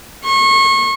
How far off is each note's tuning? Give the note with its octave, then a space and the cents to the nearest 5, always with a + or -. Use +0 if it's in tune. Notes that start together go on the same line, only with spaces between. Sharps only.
C#6 -35